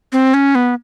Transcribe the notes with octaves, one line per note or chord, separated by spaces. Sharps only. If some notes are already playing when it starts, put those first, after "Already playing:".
C4
C#4
B3